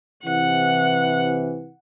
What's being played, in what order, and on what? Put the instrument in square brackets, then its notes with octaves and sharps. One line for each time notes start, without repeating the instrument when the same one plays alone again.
[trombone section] C3 E3 [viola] F#5